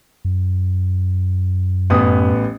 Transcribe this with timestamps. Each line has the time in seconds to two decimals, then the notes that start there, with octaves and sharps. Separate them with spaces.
0.25 F#2
1.90 A1 B3 D#6